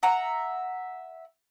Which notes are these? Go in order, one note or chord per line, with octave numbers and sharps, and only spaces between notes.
E5 F#5 A#5